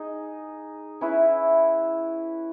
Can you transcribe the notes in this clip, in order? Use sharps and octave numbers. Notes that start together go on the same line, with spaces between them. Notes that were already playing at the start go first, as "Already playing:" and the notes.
Already playing: D#4 G#4 D#5
C#4 E4 B4 E5